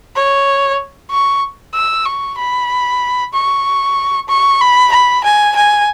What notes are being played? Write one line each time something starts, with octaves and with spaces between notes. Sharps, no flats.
C#5
C#6
E6
C#6
B5
C#6
C#6
B5
B5
G#5
G#5